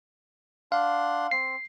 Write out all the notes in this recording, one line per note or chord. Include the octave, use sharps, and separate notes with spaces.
D4 F5 F#5 C6
C4 C7